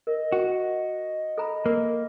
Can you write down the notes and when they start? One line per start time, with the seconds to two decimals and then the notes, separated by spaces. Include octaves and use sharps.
0.07 A#4 D#5
0.32 F#4
1.38 A4 A#5 B5
1.66 A#3 A#4